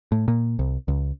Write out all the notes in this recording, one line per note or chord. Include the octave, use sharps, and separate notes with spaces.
A2
A#2
C2
C#2